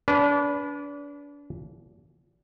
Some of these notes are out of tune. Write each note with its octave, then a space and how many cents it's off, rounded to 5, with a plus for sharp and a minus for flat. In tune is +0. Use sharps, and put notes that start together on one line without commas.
D4 -35 B4 +0